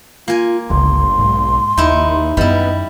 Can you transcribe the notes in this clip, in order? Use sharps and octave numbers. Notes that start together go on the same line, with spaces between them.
A#3 F4 G#5
G1 C#2 C6
B1 G#2
F#1 D#2 D#4 E4
F#2 D#3 G3 B3 E4 D#5